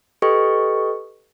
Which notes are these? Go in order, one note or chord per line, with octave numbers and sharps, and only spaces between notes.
G4 A4 B4 D#5 G5 C#6